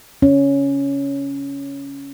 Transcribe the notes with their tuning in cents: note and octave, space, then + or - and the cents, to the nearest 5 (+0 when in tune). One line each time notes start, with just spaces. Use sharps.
C#4 +5